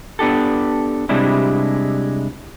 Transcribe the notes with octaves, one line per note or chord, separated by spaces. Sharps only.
B3 D4 G4 A4
C3 G3 G#3 D4 E4